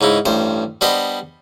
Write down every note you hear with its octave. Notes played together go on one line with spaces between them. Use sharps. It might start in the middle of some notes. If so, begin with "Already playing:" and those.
G#2 C#3 D#4 E4
A1 G2 C5
G3 B3 D4 G4 C5 D#5